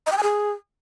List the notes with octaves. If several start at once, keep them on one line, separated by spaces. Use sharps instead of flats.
D#5
G5
G#5
G#4